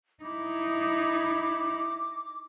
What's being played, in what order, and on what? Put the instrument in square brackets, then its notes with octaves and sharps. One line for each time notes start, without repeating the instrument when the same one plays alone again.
[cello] D#4 E4 [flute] D6